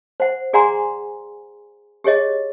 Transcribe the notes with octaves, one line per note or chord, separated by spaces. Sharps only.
C5 F#5
G#4 D5 F#5 G#5 A#5 C6
G4 G#4 C#5 D#5